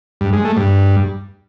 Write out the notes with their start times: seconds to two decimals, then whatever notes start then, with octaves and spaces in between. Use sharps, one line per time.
0.21 G2
0.33 G#3
0.45 A3
0.57 G2